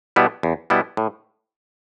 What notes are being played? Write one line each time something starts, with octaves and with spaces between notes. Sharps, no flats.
B2 G3 B3 E4
E2
B2 G3 B3 E4
A2